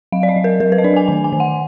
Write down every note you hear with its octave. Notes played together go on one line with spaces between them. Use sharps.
F#3 F5
D5
D#5
F#3
A#4
F#3 A#4
B4
D#5
D4 D5
G#5
D#3 G#5
G#5
D#3
F#5